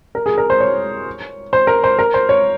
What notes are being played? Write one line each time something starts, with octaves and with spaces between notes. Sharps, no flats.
A#4
G#4
A#4
C5
C#5
C5
A#4
C5
A#4
C5
C#5